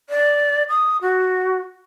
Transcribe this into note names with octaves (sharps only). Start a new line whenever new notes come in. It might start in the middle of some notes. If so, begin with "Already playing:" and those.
D5
D#6
F#4